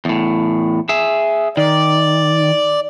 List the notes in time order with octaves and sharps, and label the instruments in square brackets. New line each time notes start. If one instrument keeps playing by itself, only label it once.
[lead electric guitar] E2 A2
G#4 E5
[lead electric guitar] D#3 [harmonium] D5